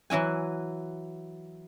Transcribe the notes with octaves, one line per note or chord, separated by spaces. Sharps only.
E3 F#3 E4 G#5